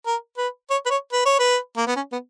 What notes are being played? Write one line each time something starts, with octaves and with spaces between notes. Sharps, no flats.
A#4
B4
C#5
B4
C#5
B4
C#5
B4
A#3
B3
C#4
B3